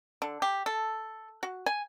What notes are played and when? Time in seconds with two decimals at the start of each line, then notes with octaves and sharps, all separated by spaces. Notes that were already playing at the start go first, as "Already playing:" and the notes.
0.22 D3
0.42 G4
0.66 A4
1.43 F#4
1.66 G#5